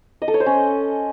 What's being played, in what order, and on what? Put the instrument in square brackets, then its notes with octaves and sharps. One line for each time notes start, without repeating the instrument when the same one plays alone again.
[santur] D#5
A4
C#5
C5
C#4